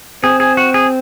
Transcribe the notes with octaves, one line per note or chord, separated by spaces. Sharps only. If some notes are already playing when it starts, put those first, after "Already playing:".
C4 G#4
G#4
F#4
G#4